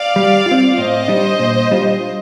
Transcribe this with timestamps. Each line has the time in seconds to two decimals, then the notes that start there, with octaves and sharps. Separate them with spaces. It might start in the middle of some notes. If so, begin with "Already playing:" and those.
Already playing: D5 F5
0.16 G3
0.46 F4
0.51 C4
0.77 A2 C5 D#5
1.08 G3 D4
1.39 A#2
1.71 G3 D4 F4